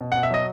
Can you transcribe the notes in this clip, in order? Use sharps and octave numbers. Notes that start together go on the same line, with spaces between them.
B2
B2 F#5
E5
F#3 D#5